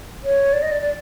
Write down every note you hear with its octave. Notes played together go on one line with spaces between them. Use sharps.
C#5
D5
D#5
D5
D5